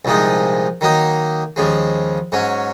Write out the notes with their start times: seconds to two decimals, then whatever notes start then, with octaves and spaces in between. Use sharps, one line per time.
0.05 C2 A#2 F3 G#3 D#4
0.81 D#3 F#3 A#3 D#4
1.56 D#2 C#3 F3 G#3
2.32 G#2 F#3 C#4